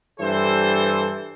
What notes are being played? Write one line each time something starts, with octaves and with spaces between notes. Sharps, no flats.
G2 E3 A4 C5